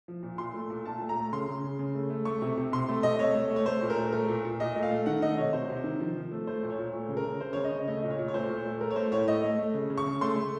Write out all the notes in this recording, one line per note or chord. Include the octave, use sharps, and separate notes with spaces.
F3
A#2
A#2 C6
A3
A#2
A#2 A5
A3
A#5
A3
C#3 C6
C#3
C#3
C#3
A3
A3
A3 C#6
C3
C3
C3 C6
A3
C3 D#5
A3 C#5
A3
A3
C#5
A3 C5
A#2
A#4
A3
A3 A#4
A#2
A#2
A#2 D#5
A3
F5
A3
D#3 F#5
A3 D#5
C3 C#5
C3 C5
C3
D#3
F3
F3
A3
A3 C5
A#2
C#5
A#2
A3
C#3
A#4
C#3
C#3 C5
C#3 C#5
D#5
C#3
A3 D#5
A#2
C#5
A#2
C#5
A3 C5
A#2
A3
A3 A#4
C#5
A3 C5
A2 C#5
A3 D#5
A3
A3
C#3
C#3
C#6
C#3
A3 C6
A3